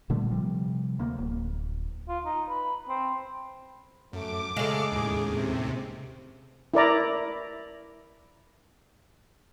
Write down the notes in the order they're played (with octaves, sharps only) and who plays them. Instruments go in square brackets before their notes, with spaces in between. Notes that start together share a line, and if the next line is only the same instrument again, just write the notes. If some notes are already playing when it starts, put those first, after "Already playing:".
[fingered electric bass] A#2 D3 G3 A3
C3 F3 G3
D2 A#3
D1
[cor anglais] F4
D#4
B4
C4
[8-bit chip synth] F#2 [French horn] A3 [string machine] D6
[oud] C#3 G#3 [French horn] A3 [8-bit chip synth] A4 F5
[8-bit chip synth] D#2 A2 [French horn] G#4
[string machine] C3
[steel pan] E4 A#4 D5 A#5